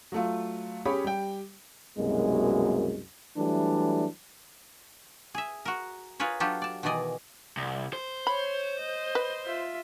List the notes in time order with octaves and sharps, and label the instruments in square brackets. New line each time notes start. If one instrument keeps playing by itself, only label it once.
[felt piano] F#3 A3 F4
C#4 G4 G#4 C#5 B5
G3 G5
[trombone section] C2 F#2 B2 G#3 A#3
E3 F#3 G3 A3 D4
[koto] G#4 E5
F#4 A#4
F4 G#4 A#4 B4 C#5
F#3 D4 F4 G4 A4
D5 A5
B2 D#3 E3 G#4 D5 D#5
[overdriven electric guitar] C2
C5
[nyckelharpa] C#5 [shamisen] B5
[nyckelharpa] D#5
[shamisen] B4
[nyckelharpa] F4 E5